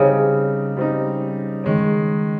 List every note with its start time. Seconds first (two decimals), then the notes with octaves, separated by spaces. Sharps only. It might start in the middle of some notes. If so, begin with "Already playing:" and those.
Already playing: C#3 G3 C4 D#4
0.77 G3 C4 D#4
1.64 D#3 G#3 C#4